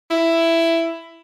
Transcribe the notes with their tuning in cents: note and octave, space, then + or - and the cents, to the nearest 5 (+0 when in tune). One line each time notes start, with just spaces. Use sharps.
E4 +10